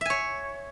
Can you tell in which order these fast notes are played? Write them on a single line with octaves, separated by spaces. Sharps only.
E5 G#5 C#5